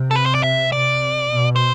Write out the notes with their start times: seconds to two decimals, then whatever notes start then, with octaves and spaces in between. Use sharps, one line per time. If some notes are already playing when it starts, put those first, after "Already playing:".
Already playing: C3
0.11 A4
0.16 B4
0.26 C5
0.35 D5
0.43 E5
0.72 C3 D5
1.28 B2
1.56 C5